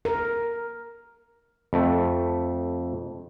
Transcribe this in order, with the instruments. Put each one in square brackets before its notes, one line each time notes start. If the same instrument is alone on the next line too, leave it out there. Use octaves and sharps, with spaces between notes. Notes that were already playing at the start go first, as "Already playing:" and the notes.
[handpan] A#4
[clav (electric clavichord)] F2 A3